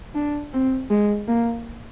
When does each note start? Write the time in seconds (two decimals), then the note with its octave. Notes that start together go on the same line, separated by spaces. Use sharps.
0.15 D4
0.53 C4
0.90 G#3
1.28 A#3